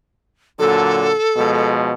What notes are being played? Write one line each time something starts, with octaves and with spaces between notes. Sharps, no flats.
A#2 D3 F#3 A4
B2 F3 G#3